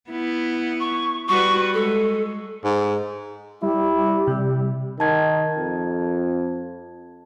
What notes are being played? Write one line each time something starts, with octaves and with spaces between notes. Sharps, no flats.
B3 E4
C#6
G3 F#4 B4 C#6
G#3 A4
G#2
G3 E4 G4
C3
D#3 A5 G#6
F2